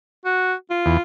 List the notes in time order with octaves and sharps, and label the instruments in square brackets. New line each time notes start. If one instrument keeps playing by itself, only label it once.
[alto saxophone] F#4
F4
[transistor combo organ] E2